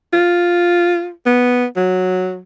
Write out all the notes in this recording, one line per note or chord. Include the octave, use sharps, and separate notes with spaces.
F4
B3
F#3